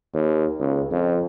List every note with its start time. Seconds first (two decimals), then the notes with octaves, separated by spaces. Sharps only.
0.14 D#2
0.60 C#2
0.92 F2